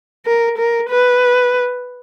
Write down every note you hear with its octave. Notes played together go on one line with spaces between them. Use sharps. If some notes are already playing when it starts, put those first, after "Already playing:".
A#4
A#4
B4